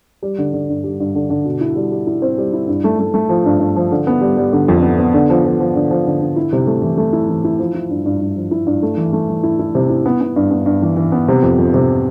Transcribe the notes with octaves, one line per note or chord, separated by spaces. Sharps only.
G3
D3
D3
G2
G3
G2
D3
D3
B2
E4
G3
G3
E4
C4
G3
E4
G2
A3
A3
A3
F3
G2
G2
F3
D3
B3
G3
G3
D3
F2
B3
B3
D3
F3
F3
F3
D3
F3
D3
D3
E4
C3
A3
E3
A3
E4
E3
E4
F3
E4
G2
G2
G2
F3
E4
G2
A3
E3
A3
E3
E4
E4
C3
E4
B3
B3
G2
B3
G2
E3
E3
B3
C3
F2
F2
C3